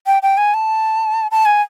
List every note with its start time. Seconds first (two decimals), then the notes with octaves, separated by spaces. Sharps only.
0.06 G5
0.23 G5
0.37 G#5
0.54 A5
1.31 A5
1.46 G#5